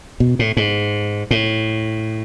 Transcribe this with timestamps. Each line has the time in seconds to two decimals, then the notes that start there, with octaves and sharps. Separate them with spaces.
0.20 B2
0.39 A2
0.57 G#2
1.31 A2